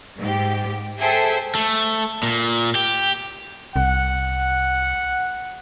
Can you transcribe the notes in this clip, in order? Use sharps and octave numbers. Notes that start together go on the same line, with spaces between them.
G#2 G4
G#4 A4 C5 E5 G5
A3
A#2
G4
C2 F#5